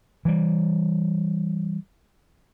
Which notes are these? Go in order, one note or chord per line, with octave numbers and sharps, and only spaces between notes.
E3 G3